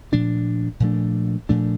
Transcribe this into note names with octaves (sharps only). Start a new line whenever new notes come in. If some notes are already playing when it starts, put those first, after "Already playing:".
A#2 F3 A3 D4
A#2 F3 A3 D4
A#2 F3 A3 D4